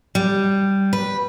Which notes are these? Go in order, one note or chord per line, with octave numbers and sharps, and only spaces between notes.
G3
B4